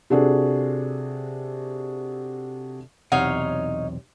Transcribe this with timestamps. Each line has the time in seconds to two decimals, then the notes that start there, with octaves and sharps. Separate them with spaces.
0.10 C3 D4 F#4 G#4 A4
3.12 B1 E2 C3 D#4 C#5 F5 F#5